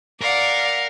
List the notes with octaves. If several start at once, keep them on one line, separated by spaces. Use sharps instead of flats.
A#4 D5 F5 F#5